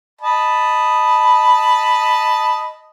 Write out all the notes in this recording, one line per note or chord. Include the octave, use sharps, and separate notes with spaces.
D#5 A5 B5